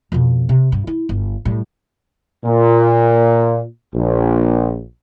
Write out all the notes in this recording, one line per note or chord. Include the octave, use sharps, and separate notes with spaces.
F2 B2
C3
G2
E4
G1
A2 G3
A#2
A#1